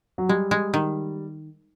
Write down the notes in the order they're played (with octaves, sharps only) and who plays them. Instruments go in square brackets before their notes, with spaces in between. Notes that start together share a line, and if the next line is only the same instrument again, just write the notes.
[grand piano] F#3
[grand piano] G3 [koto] G#3
[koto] G#3
D#3